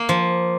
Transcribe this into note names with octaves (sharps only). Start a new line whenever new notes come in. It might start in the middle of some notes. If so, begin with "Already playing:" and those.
Already playing: A#3
F3